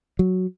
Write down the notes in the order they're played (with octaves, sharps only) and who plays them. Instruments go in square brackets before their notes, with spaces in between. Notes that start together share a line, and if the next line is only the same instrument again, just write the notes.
[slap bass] F#3